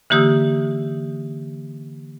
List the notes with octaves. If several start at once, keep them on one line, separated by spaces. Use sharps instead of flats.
D3 E3 A#3 G4 D#6 E6